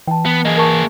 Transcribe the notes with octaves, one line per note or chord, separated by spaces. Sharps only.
E3 G5 A5
B3
A#3 G#4 D#5
A#4 A5 C#6